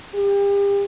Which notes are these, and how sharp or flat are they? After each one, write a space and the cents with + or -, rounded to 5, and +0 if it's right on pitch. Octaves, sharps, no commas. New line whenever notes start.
G4 +35